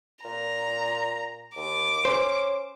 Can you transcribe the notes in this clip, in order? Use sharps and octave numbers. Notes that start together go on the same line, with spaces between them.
A#2 A#5
D#2 D6
C#4 C5